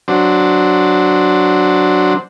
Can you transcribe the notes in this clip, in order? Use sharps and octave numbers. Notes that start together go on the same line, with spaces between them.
F#3 D4 C5